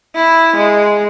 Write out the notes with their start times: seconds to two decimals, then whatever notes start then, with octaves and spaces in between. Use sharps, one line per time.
0.15 E4
0.56 G#3